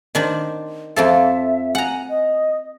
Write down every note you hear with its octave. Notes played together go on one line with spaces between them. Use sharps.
D#3 D4 C5
F2 F3 A4 E5
F#5 G#5 A#5
D#5